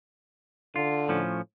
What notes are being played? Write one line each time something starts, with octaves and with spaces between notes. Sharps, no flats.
D3 F4
A2 F3 C#4